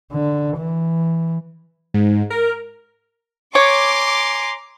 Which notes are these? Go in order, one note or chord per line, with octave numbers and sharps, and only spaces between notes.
D3
E3
G#2
A#4
C#5 G#5 A#5 C6 D6